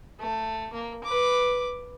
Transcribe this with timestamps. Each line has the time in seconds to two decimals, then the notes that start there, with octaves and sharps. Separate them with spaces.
0.20 A3
0.73 A#3
1.04 B4 D6